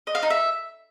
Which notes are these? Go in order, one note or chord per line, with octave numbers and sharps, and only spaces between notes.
D#5
F5
D#4
E5